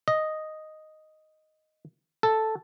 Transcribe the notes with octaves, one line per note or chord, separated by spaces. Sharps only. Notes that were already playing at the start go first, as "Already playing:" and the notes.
D#5
A4